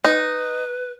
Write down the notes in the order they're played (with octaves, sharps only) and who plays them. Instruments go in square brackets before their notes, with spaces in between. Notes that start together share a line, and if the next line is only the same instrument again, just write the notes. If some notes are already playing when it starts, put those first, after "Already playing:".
[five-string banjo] D#4 [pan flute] B4